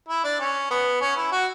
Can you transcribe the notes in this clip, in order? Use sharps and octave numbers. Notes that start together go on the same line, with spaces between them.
E4
D4
C#4
B3
C#4
E4
F#4